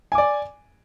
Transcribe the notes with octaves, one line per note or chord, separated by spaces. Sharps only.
D5 G#5 D6